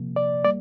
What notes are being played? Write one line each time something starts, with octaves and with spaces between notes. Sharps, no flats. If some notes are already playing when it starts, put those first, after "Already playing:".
Already playing: C3 F3 A#3
D5
G3 A#3 D5